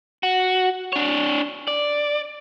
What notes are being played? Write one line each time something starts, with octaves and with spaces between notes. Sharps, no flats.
F#4
D4 C#5
D5